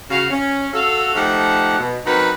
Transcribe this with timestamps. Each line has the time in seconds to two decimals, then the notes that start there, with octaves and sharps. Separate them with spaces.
0.10 C#3 F#4 F5
0.30 C#4
0.73 F#4 A4 F5
1.15 F3 A3 D#4 G4 F#5
1.79 B2
2.05 F#3 C4 D#4 F#4 A#4 B4